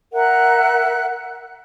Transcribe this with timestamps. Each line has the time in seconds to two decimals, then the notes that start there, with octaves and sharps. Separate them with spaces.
0.13 A#4 E5 F#5 F#6